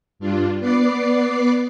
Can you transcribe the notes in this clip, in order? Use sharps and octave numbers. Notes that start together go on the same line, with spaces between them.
G2 D4 F4
B3 B4 D5 D6 C7